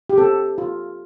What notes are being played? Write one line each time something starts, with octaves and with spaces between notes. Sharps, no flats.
G4
C4 A4
F4